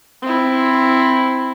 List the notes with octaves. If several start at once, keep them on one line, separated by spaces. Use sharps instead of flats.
C4 E4